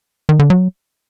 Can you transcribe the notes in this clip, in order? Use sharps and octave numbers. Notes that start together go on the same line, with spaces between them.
D#3
D3
F#3